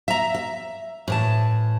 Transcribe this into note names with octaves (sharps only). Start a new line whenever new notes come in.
E5 A#5
E5
A2 E3 A5